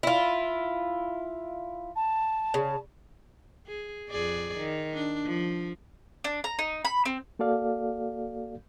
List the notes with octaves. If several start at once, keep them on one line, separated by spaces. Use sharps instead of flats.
E4 F4
A5
C#3
G#4
F2 G#4 D5
D#3
D4
F3
D4
A#5
D#4
B5
C4
A#3 F#4 A4 D5 F5